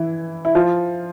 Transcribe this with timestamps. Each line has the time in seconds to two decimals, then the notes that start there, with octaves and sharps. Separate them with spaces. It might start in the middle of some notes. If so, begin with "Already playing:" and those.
Already playing: E3 E4
0.45 E4
0.55 F3 F4